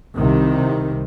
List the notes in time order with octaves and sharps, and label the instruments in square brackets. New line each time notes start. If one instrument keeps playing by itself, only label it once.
[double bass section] C2 C3 D#3